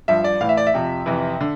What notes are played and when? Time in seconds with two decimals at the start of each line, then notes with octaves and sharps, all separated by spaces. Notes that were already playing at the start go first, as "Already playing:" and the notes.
0.08 G2 F3 E5
0.24 D5
0.40 A2 E3 F5
0.49 E5
0.57 D5
0.67 E5
0.74 F2 C3 F3
1.06 F2 C3 E3
1.41 D3